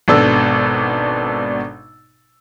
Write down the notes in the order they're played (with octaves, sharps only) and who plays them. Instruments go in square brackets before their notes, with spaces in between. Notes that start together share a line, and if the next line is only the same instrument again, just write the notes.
[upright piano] G#1 B2 D4 A4 E6